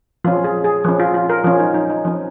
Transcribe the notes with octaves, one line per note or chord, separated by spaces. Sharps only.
F3 C#4 F4
G#4
G#4
F3 C#4
F4
F4
A#4
F3 C#4 F4
D#4
D#4
D#4
F3 C#4